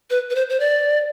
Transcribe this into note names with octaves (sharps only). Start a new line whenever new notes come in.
B4
B4
C5
C5
D5